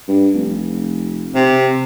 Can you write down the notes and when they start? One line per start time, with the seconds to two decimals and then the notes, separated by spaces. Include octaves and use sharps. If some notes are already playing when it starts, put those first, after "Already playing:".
0.08 G2
0.34 F1
1.35 C3